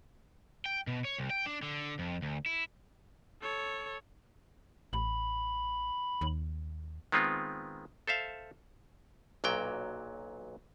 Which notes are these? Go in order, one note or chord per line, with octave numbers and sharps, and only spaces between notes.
G5
B2
C#5
C2
G5
D4
D3
F2
D2
E4
A4 C#5
A1 B5
D#2
D#3 G#3 B3 C4 F4
A4 C5 E5 F5
B1 A#2 F#3 G5